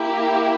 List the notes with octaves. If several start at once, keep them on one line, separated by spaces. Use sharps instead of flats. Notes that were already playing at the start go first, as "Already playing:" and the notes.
Already playing: A#3 E4 G4